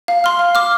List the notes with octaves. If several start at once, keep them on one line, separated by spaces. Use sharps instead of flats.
F5
C6 F6
F5
D6 F6